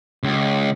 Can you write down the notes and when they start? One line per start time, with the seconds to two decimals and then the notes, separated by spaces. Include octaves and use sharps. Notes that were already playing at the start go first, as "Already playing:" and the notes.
0.23 C#2